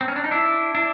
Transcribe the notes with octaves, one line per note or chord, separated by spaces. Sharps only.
C4
C#4
D4
D#4
D4 E4
D4 E4